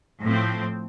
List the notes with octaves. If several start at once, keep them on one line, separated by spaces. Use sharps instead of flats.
A2 F3 C4